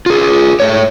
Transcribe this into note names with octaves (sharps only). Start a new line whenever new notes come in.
F4 G#4
A3 C#5